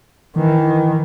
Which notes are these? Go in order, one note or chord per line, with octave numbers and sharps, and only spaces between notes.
D#3 E3